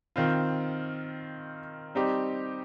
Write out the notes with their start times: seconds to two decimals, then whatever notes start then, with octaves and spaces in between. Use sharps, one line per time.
0.16 D#3 C4 F4
1.95 G3 C4 D#4 G4